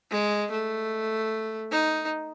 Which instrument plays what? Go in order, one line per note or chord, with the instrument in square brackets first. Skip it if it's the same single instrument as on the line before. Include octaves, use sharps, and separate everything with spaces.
[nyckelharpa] G#3
A3
D#4